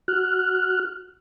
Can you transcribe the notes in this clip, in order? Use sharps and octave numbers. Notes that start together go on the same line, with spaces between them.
F#4 F6 F#6